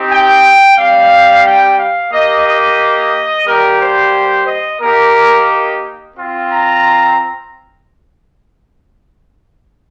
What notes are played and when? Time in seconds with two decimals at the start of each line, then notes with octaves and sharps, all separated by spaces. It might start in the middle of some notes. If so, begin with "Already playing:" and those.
Already playing: C4 D#4 G4
0.09 G5
0.77 G3 C4 G4 F5
1.44 G5
1.78 F5
2.11 A#3 G4 D#5
2.45 D#5
3.46 G3 A#3 G4 A#4
3.80 C5
4.47 D#5
4.81 A#3 D#4 G4 A#4
6.16 C4 F4
6.49 A#5